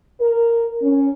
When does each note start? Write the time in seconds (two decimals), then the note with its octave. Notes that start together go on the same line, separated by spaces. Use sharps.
0.21 A#4
0.82 C#4